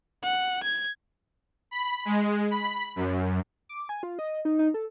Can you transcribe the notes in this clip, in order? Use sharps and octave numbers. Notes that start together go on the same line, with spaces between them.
F#5
G#6
B5
G#3
B5
F#2
D6
G#5
F4
D#5
D#4
D#4
A4